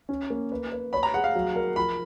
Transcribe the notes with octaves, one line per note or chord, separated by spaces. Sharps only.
C#4
A#3
B4
B4
C#5 B5
A#5
G#4 F#5
F5
F#3
A#4
F3 B5